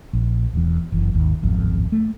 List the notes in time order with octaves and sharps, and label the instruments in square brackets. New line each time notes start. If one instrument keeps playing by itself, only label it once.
[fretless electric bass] A#1
E1 E2
F#1 E3
G#1 D#2
D1 G#1 F2
A3